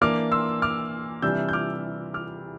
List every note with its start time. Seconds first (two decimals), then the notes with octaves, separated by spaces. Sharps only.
0.01 E3 A#3 D4 D6 F6
0.32 C6 E6
0.62 D6 F6
1.22 C3 E3 G3 D4 E6 G6
1.49 G6
1.53 D6 F6
2.14 D6 F6